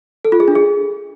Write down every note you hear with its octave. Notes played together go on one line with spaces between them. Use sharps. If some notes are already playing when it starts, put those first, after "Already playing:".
A4
F4
G#4
D4
G#4